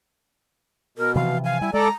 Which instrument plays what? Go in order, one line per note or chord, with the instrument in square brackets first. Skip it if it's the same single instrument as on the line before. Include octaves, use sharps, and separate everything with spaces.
[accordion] B2 [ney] A#4
[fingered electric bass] C3 E3 F3 [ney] F5
[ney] F5 [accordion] G#5
[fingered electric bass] G3 [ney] E4
[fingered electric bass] G#3 [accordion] A4 D5 [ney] A#5